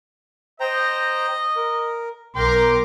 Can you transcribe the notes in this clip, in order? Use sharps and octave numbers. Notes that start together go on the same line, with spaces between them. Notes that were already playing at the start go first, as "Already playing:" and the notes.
C5 D#5 G5 A#5
A#4
B1 A#4 G5 C6 D6